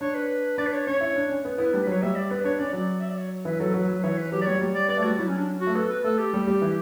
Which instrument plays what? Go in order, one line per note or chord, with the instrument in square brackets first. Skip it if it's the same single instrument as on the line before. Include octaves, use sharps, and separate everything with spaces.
[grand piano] D4 [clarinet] C#5
[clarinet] B4
[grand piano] D4 [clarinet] D5
[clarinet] B4
C#5
[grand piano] C#4 [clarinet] C#5
[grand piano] E4
D4
C#4
B3
[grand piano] B3 [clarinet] E4
[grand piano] G3 [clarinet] D4
[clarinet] B4
[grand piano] F#3
[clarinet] C#5
[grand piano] G3 [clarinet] E5
[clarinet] D5
[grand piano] B3 [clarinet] B4
[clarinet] B4
[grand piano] D4 [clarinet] C#5
[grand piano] C#4 [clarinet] D5
[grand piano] F#3 [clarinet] D5
[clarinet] E5
D5
C#5
[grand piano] E3 [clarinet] B4
[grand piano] F#3 [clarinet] A4
[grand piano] F#3 [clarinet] B4
[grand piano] F#3
[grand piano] E3 [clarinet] C#5
[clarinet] B4
[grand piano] F#3 [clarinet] G4
[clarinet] D5
[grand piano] G3 [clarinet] C#5
[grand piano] F#3
G3
[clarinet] D5
[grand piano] B3 [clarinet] D5
[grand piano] A3
[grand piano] G3 [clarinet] F#4
[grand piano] F#3 [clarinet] E4
[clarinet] C#4
D4
F#4
[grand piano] A3
[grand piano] B3 [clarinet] A4
[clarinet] B4
[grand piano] A3 [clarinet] A4
[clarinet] G4
[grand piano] G3
G3
E3